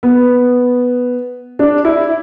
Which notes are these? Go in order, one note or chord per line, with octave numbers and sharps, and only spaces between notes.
B3
D4
E4